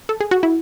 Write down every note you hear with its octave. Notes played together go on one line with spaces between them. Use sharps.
A4
G#4
F#4
E4